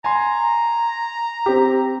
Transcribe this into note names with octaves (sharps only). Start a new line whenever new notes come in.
G#5 A#5 C6
C4 G4